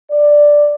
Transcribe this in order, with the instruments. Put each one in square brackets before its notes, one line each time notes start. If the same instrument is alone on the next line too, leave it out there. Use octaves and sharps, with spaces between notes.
[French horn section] D5